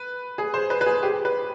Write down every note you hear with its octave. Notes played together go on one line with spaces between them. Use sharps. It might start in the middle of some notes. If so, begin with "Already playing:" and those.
Already playing: B4
G#4
C5
B4
B4
G#4
G4
B4